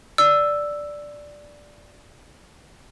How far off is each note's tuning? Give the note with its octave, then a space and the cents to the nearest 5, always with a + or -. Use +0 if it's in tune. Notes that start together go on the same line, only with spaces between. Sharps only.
D5 +0 E6 +0